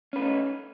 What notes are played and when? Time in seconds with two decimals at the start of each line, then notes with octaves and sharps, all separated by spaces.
0.13 C#4
0.16 B4
0.19 A3
0.22 D#4